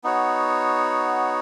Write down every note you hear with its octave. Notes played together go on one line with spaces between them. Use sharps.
B3 D#4 F#4 C#5